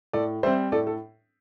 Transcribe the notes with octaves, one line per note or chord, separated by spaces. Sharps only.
A2 A4 D5
G3 C4 C5 E5
A2 A4 D5
A4